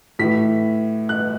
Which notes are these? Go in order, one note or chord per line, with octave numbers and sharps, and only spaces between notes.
A2 E3 B6
F#6